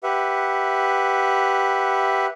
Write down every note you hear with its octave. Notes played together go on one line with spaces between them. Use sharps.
G4 B4 E5 F#5